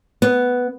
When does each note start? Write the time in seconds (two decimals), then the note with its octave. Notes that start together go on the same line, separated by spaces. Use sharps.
0.22 B3